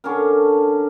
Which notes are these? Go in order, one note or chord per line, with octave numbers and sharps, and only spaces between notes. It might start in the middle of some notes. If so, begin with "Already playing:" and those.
D3 C#4 D4 A#4